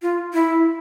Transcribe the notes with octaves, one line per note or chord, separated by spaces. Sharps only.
F4
E4